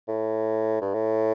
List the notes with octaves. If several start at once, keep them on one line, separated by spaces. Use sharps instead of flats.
A2
G2
A2